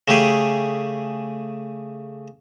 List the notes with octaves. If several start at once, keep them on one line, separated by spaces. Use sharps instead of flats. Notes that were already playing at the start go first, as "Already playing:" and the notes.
C#3 A3 G4 G#4